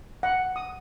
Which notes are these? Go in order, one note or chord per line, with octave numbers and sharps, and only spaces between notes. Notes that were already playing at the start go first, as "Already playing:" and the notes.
F#5
D#6